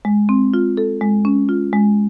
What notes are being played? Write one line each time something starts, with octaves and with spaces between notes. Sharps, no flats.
G#3
C4
F4
A4
G#3
C#4
F4
G#3